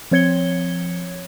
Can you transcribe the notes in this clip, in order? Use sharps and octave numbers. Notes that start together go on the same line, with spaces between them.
F3 C4 C#5 G#6 C#7 G7